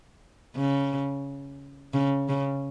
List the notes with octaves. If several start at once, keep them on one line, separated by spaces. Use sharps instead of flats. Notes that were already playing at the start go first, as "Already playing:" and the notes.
C#3
C#3
C#3